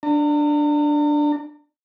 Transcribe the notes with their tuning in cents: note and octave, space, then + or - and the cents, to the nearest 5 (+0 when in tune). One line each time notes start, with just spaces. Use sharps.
D4 +0 A#5 -45